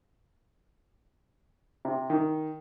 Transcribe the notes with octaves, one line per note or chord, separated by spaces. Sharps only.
C3
D#3